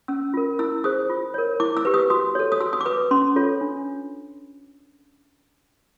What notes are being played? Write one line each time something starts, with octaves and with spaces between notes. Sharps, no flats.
C#4 E6
F4 A#4
E4 E6
G#4 C5 D#6
F4
A#4 C#5
E4 D6
E6
G4 B4
D#6
F#4 D#6
A4 C#5
D#6
F#4 E6
D#6
D6
B4 D#6
C#4 C6
F4 A4 C#5
D4